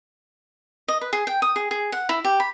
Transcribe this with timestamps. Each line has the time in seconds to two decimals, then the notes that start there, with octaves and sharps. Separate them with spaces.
0.88 D#5
1.01 B4
1.13 G#4
1.27 G5
1.42 D#6
1.56 G#4
1.71 G#4
1.92 F#5
2.09 E4
2.24 G4
2.40 B5